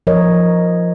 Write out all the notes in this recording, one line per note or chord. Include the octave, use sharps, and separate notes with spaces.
F3 A#4 C#5 D#5